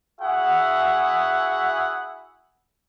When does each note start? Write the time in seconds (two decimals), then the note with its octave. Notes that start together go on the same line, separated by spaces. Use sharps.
0.21 E4 F#4 G#4 E5 F#5